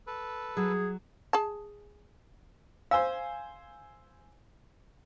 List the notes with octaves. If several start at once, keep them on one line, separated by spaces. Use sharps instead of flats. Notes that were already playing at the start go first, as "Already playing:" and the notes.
A4 B4
F#3 G#4
G#4 A5
C5 F5 G#5 E6